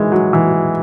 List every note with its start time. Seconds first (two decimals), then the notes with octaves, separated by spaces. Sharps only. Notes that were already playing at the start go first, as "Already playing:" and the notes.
Already playing: D#3 E3 G#3
0.12 F#3
0.33 E3